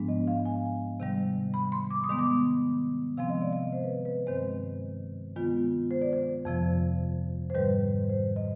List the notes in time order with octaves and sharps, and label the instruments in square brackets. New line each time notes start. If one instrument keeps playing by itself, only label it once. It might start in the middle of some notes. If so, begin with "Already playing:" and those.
Already playing: [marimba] G#2 F3 G#3 B3 D4
D#5
F5
G#5
C3 D#3 G3
B5
C6
D6
D#6
D#3 G#3 B3
D6
C3 F3 G#3 C4 F5
D#5
D5
D#5
C5
B4
B4
G2 D#3 G#3 C4 C5
D#3 G#3 B3 F4
C5
D5
C5
F2 C3 F3
C5
G#2 D#3 G3 B4
C5
D#5